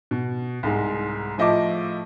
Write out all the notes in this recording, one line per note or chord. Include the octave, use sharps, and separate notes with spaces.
B2
C2 G#2 G#3
A2 F3 D#5 E5 A5 D6